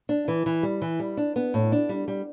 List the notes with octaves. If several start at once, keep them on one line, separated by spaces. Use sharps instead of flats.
D4
E3
E3
G3
E3
G3
D4
B3
A2
D4
G3
G3